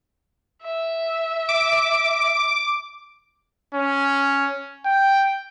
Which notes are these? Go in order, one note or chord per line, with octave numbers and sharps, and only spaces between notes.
E5
D6
C#4
G5